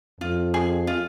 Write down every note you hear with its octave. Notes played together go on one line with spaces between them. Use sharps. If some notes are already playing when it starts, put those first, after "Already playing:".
F2 F4
G#4
F4